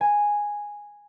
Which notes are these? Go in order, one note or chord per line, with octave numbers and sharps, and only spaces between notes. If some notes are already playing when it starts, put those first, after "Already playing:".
G#5